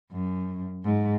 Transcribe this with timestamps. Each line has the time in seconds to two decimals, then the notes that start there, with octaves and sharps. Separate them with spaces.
0.12 F#2
0.84 G#2